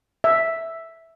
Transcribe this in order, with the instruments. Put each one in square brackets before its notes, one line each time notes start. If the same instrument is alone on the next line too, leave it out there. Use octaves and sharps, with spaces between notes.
[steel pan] E5